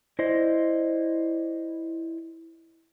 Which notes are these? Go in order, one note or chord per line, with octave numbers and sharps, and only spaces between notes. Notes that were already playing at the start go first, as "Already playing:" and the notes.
E4 C5 D5 D#5